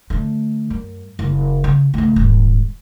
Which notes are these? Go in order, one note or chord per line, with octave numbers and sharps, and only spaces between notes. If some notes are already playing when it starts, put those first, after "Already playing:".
D3 A3
F#2
F#1
C#3
C#2 A3
D#1 G#2